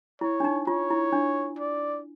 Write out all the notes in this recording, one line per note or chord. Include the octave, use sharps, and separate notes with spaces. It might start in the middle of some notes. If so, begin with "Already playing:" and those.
E4 C#5
D4
D#4
F4 C#5
E4
D4
D5